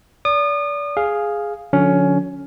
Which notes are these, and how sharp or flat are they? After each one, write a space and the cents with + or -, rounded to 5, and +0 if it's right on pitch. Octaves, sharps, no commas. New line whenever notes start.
D5 -30 D#6 -35
G#4 +0 F5 +0
D3 +0 F#3 -45 C#4 +15